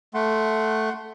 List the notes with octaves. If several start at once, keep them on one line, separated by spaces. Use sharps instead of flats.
A3 F#5 C6